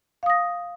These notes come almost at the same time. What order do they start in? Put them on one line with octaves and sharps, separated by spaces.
F5 D#6 A#6